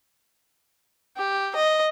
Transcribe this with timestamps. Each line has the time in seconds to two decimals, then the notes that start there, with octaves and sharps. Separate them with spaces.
1.17 G4
1.55 D#5